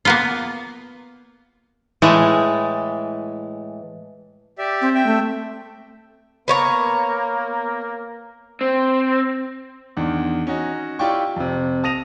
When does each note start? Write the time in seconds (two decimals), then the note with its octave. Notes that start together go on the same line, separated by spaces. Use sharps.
0.05 A#3 B3 F4
2.02 A2 E3 G#3 A3
4.58 G4 D5 E5
4.81 C4
4.95 E5 G5
5.06 A3
6.48 A#3 B3 C#5 A#5
8.61 C4
9.97 E2 D#3 D4
10.47 C#4 D#4 F#4
10.99 E4 F4 G4 D5 G5 C#6
11.36 F2 C3
11.84 A5 D#6 A#6 D#7 F7